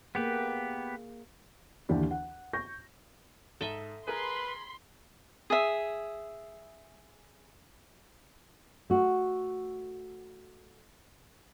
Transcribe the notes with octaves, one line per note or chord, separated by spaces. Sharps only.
A#3 B3 G4 G#4 B4
D#2 D3 E3 D4 G4
F#5
C#6 G6 A#6
G#2 A4 D#5 E5
G#4 A#4 B4 B5 C6
G#4 E5
A3 F#4